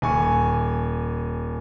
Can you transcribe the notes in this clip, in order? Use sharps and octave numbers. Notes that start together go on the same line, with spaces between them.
D#1 G#5 C#6